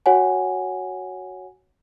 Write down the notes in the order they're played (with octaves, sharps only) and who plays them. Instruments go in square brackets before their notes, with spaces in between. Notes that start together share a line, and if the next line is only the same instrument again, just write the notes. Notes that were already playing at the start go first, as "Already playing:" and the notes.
[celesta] F#4 C#5 F#5 G#5